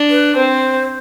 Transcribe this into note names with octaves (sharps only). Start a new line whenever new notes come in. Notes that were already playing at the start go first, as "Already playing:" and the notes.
Already playing: D4
B4
C4 C5